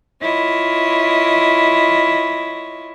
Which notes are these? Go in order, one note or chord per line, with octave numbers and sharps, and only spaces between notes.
E4 F4 C#5 D#5